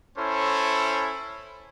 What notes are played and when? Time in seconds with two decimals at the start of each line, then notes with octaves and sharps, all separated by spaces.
0.18 C#4 E4 A4 C5